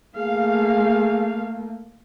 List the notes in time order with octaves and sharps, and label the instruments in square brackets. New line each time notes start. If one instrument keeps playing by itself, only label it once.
[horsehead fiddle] A3 A#3 [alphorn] G#4 [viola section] F5